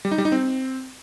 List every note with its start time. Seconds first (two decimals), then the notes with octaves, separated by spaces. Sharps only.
0.05 G3
0.11 D#4
0.18 G3
0.25 D#4
0.32 C4